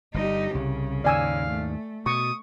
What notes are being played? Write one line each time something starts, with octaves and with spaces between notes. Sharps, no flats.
G1 D3 G3 D#4 G4
C2 C#3
D#2 G#2 D5 F5 G#5 E6
A3
B2 C#6 D#6